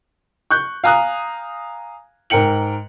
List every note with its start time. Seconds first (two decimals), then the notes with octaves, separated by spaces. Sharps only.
0.51 C#6 F#6 G6
0.84 F5 G#5 A#5 D#6 F#6
2.30 G#2 A#4 G5 C#7 F#7